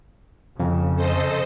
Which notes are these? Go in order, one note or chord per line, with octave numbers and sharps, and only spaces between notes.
F2 C#3
A4 C5 D#5